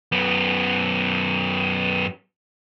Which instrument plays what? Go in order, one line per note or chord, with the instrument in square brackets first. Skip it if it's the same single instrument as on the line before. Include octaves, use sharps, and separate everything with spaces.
[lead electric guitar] F#2 B3